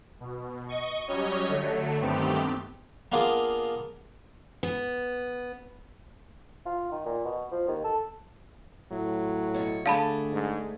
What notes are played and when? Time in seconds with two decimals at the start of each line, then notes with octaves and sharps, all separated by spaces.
0.20 B2
0.69 D#5 C#6
1.07 F#3 G3 C#4 C#5 D#5
1.48 D3 F#3 A3
2.01 G2 D#3 A3 B3 C4 G4
3.12 A#3 B3 D4 F4 G#4 A#4
4.63 B3
6.66 F4
6.92 D#3
7.06 A#2
7.25 B2
7.51 F3
7.68 D#2
7.84 A4
8.92 A2 F#3
9.54 B2 C#5
9.86 D3 A3 G#4 D5 F5 A5 B5
10.33 G#2